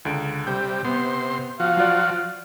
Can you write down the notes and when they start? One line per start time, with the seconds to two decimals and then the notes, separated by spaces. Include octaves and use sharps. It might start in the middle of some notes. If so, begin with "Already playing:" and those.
0.05 C#2 D3 D7
0.47 C3 G3 G6
0.85 C3 B3 C6
1.60 F3 F#4 F5
1.77 F#3 F4 D5